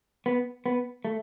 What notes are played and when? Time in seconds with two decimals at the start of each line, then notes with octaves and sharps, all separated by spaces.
0.26 B3
0.66 B3
1.05 A3